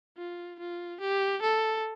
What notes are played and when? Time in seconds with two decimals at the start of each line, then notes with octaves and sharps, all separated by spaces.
0.18 F4
0.59 F4
1.01 G4
1.42 A4